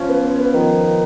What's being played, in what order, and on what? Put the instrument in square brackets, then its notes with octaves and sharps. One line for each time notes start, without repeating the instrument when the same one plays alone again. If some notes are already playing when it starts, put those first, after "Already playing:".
Already playing: [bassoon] F3 [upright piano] C#4
[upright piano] B3
B3
B3
[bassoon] D#3 [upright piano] F3